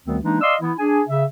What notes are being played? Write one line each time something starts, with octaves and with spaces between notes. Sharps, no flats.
D2 D#3 G3 B3 C4
E3 G#3 A#3 D4 D#4
D5 D#5 F5 C6 D#6 E6
E3 B3 E4
D4 G#4 G#5
C#3 E5